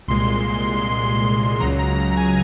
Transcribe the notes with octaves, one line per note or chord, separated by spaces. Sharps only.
C2 A#2 G#3 C6
C#2 C#3 F#3 A#5
A#5
A#5
G#5